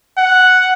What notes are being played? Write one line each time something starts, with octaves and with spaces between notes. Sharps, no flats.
F#5